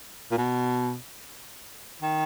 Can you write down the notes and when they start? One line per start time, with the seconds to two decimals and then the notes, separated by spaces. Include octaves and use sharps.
0.31 A#2
0.38 B2
2.02 D#3